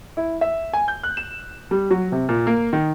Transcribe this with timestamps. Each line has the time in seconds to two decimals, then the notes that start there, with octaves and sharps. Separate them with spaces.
0.17 E4
0.41 E5
0.73 G#5
0.88 G6
1.03 F#6
1.17 E7
1.71 G3
1.91 F#3
2.12 C3
2.29 A#2
2.47 A#3
2.73 D#3